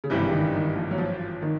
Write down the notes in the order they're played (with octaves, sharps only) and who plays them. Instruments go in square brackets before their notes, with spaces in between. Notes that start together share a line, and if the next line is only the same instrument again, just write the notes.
[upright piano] C#3
[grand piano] G#1 G2 E3 G3 [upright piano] C3
[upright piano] D#3
D#3
F3
F#3
F3
D#3